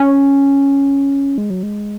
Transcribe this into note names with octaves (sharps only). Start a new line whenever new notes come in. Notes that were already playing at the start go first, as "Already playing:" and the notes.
Already playing: C#4
G#3
F#3
G#3